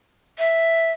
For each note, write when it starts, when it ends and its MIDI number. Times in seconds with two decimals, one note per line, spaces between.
0.39 0.92 76